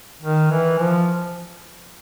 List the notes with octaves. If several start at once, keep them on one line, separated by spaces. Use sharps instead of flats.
D#3
E3
F3